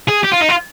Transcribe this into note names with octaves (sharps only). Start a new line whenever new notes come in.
G#4
G4
F4
D#4
F4